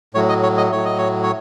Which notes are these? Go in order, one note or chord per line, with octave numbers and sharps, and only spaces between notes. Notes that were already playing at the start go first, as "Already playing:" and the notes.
A2 F#3 C#5
D#5
C#5
D#5
A2 F#3 C#5
D#5
C#5
C#5